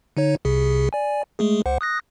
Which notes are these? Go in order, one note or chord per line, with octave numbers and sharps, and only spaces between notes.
D3 D#4 C#5
C2 C3 G#4
D5 G#5
G#3 A3 G#4
C#2 C5 F#5
D#6 F#6 A#6